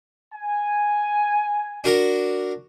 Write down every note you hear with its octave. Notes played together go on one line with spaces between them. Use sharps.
G#5
D4 F#4 A#4